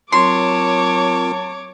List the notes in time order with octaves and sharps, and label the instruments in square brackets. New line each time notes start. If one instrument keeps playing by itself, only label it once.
[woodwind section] F#3 A5 [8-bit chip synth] C4 F4 A#4 [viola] C#5 D6 [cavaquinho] C6